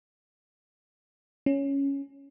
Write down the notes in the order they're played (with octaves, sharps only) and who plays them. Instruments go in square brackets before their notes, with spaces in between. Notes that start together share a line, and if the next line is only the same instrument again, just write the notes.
[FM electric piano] C#4